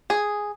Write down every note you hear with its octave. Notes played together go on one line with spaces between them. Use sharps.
G#4